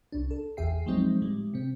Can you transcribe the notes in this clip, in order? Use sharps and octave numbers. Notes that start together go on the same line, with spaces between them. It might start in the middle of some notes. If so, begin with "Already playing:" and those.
C2 D4
A4
G#1 E2 G#4 E5 G5 C7
F3 F#3 G#3 C4 D#4
A2 G3 G#3
C3 C4